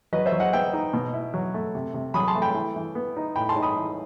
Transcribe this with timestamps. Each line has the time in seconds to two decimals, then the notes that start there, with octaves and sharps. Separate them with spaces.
0.13 F#3 B4 D#5
0.26 C5 E5
0.32 F#3
0.40 D#5 F#5
0.53 B3 E5 G5
0.73 D#4
0.93 B2
1.13 E4
1.34 F#3
1.54 A3
1.75 C3
1.94 C3
2.14 F#3 B5 D#6
2.28 A5 C6
2.35 A3
2.42 G5 B5
2.55 E3
2.76 E3
2.95 B3
3.16 D#4
3.36 A2 G5 B5
3.49 A5 C6
3.56 D#4
3.62 B5 D#6
3.76 E3